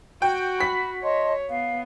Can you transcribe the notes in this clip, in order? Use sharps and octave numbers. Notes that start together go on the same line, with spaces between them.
F#4 G5
B5 B6
C#5 D#5 A5 C6
B3 F5